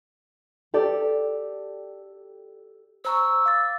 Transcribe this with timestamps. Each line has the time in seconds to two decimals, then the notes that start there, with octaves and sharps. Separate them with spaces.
0.74 G4 A4 D5
3.05 C5 A#5 C#6 E6
3.46 F5 D6 A6